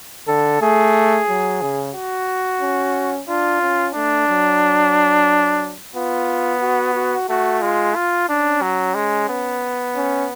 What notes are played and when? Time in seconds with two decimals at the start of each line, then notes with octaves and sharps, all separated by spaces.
0.28 D3 A4
0.61 A3 G#4
1.28 F#3
1.61 C#3
1.95 F#4
2.61 C#4
3.28 D4 F4
3.62 C#4
3.94 A3 D4
4.28 F#3
5.95 B3 F4
6.61 F#4
6.95 F#4
7.29 A3 F#4
7.62 G#3 F4
7.95 F4
8.28 C#4 D4
8.62 F#3
8.95 G#3
9.29 B3
9.96 C#4